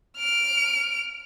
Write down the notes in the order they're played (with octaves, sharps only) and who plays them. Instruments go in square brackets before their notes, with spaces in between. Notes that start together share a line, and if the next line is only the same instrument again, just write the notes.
[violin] F6 D7